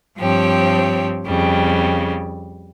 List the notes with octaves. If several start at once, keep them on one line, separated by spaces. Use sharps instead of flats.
G2 F3 C4 G4 C#5
F2 C#3 G3